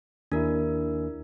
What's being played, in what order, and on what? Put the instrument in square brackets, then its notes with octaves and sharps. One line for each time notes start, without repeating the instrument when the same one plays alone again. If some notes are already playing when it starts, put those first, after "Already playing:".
[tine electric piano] D#2 E4 [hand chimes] D4 A#4